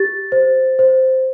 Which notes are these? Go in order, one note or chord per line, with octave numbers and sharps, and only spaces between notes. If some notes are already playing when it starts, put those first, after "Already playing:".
Already playing: G4 A6
C5
C5